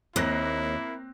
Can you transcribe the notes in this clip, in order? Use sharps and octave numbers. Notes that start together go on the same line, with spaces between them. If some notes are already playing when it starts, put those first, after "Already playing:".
D#2 A#3 C4 E4 F#6 A#6